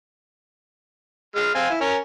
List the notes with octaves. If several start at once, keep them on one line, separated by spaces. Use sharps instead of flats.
G#3 F6
C4 F5 G#5
E4
C#4 A#4